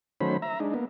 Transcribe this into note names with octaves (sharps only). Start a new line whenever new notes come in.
D#3 F#3 A3 C#4 C5 B5
E5 A#5
G#3 D4 D#4
A#3 B3